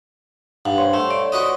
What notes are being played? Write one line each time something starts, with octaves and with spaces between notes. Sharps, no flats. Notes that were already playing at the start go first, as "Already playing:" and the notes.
G2 F#5
C5 C#5 C#6
A3
D5
F#4 B4 D#5